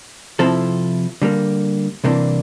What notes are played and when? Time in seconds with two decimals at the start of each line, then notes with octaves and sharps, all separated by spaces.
0.39 C3 F3 C4 E4 A4
1.22 D3 G3 A#3
2.04 C2 C3 E3 A#3 D4